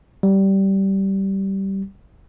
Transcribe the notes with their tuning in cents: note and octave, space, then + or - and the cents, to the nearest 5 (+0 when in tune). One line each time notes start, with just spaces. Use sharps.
G3 -15